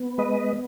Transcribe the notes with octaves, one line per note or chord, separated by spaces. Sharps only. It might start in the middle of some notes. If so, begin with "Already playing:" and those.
Already playing: B3
G#3 B4 D#5